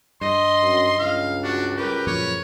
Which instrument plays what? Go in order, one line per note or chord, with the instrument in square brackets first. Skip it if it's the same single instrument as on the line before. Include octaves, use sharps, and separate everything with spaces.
[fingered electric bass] G2 [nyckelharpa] D#5 [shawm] C6
[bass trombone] F#2
[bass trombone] C#2 [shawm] F5
[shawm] D4 [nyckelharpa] F#4
[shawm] G4 [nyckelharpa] A#4 B4
[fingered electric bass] F#2 A#2 F3 [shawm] C#5